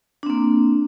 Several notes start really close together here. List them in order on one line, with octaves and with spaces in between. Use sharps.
D4 C4 A#3